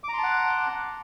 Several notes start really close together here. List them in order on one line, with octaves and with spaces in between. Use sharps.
D6 A#5 C6 A5 F#5